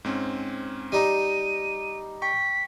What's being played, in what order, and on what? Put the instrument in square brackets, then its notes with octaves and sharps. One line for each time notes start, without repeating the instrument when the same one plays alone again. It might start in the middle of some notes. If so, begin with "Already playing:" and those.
[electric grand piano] G#2 C4 C#4
[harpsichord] G3 D#4 [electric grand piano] D#5 A#5 [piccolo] D#7
[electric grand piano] G5 C#6 [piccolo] B6